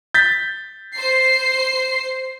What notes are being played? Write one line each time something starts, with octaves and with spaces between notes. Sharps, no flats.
G6 A6 B6
C5 C7